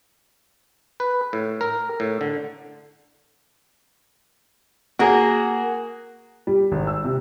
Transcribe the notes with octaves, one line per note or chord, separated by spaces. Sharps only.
B4
A2
A#4
A2
D3
A#3 F#4 G#4 A#4
G3
G#1
E6
C3